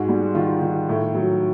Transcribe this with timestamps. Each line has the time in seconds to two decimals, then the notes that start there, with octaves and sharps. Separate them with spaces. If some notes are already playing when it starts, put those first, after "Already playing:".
Already playing: G#2 G#3 F#4
0.09 G3
0.35 D#3 F4
0.62 D#3
0.89 A2
1.15 F#3